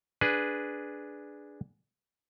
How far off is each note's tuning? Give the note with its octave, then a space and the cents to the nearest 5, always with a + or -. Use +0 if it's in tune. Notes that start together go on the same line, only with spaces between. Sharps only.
D4 +0 G#4 +0 B4 +0